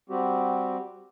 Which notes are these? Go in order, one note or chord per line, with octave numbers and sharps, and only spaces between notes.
G3 C4 F#4 G4